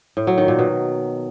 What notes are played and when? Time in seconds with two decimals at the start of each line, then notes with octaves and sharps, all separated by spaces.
0.17 A2
0.27 F#3
0.38 D#3
0.48 A#2
0.59 B2